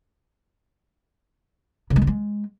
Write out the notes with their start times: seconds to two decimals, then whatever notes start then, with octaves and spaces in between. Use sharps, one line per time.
1.90 C#3
1.96 G#3
2.02 D3
2.07 G#3